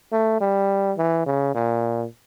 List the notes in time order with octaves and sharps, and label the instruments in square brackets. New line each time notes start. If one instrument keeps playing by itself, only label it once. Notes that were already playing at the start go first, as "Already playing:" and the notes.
[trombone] A3
G3
E3
C#3
A#2